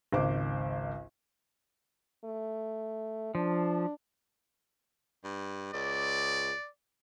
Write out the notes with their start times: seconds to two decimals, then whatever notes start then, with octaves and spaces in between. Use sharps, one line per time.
0.12 G#1 C#2 C5 D6
2.25 A3
3.35 F3 D4
5.24 G2
5.74 C#2 D5